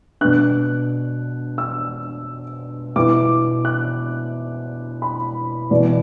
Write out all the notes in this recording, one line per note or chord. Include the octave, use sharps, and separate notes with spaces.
B2 B3 D4 F#6
E6
B2 B3 E4 D6
F#6
B5
E2 B2 B3 E4 D5